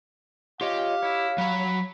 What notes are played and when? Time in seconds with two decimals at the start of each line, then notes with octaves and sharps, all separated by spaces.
0.61 F4 G4 C#5 D#5 F5
1.03 E4 C#5
1.38 F#3 A#5 B5